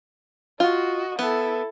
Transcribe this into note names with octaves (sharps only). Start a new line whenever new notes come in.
F4 F#4 D#5
B3 E4 A4